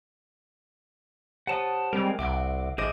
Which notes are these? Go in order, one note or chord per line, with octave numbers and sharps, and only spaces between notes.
G4 C5 C#5 F#5 A5 D#6
G3 G#3 C4 A#4
C2 E5 F#5 D6 D7
A1 G#4 C5 D#5 E5 D6 D7